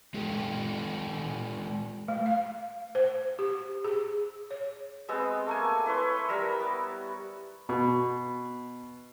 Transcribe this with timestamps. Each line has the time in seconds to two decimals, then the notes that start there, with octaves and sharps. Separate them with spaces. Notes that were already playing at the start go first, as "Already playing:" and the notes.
0.14 G#3 F4 G4 A4
2.08 A3
2.26 F5
2.95 C5
3.39 G4
3.84 G#4
4.51 C#5
5.09 G#3 B3 C4 E6
5.47 A3 A#3 G#5
5.86 E4 B4 C#5 C6
6.28 G3 A#4 A#5 E6
6.61 B3
7.69 B2